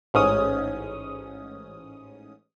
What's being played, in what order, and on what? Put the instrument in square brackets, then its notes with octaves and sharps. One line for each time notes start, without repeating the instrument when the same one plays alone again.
[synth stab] A1 G#2 C#4 D#6